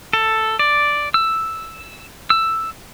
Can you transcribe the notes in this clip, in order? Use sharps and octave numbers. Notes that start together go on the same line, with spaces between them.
A4
D5
E6
E6